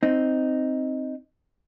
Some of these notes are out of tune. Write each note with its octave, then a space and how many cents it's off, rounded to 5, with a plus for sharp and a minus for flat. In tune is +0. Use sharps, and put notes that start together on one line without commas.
C4 +0 D#4 +0